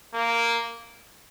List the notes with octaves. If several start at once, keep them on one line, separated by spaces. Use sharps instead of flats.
A#3